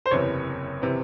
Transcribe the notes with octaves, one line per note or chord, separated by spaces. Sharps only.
C5
F#1 E2 C3 E3 C#5
C3 E3